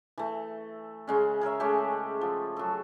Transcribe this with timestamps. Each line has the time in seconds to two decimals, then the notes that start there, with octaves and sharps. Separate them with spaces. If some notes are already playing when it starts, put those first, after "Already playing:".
0.18 E3 A3
1.07 C#3 G#3 C#4
1.41 G#4 A#4 C#5 E5
1.60 G#3 A3 C#4 G4
2.21 F3
2.57 F#3 A4